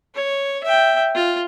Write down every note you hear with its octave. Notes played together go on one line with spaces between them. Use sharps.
C#5
E5 G5
F4